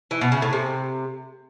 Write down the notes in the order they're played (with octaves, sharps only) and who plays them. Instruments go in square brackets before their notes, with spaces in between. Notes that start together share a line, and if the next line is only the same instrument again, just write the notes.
[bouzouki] E3
B2
C#3
A2
C3